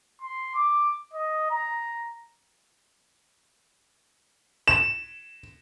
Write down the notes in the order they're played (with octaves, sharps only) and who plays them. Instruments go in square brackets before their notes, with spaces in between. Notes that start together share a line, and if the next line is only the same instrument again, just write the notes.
[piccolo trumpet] C6
D6
D#5
A#5
[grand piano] E7